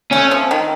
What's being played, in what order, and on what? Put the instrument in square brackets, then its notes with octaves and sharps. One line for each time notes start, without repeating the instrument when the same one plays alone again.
[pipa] A3 [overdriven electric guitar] C#4
[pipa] F3
D#3